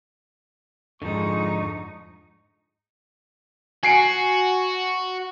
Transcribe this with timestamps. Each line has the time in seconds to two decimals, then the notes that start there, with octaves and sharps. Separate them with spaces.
1.02 F2 G#2 D3 F3 G#3 D#4 C#6
3.83 F#4 G#5 C7 D7